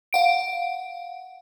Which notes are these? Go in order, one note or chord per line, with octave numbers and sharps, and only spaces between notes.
F5 F#5 D7